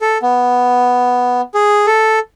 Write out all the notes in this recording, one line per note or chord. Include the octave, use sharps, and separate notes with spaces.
A4
B3
G#4
A4